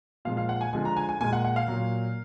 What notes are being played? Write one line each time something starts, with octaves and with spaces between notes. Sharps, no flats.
A#2 F3 G#3 F5
F5
F#5
G#5
D3 F3 G#3 G#5
A#5
G#5
G#5
A#2 G#3 G#5
F#5
F#5
F5
A#2 F#3